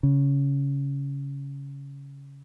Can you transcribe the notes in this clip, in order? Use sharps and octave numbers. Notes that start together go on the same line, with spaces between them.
C#3